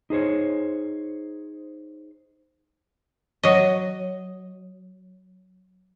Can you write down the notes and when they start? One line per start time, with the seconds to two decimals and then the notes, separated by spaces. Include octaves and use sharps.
0.10 D#4 G#4 C5 C#5
3.43 F#3 D#5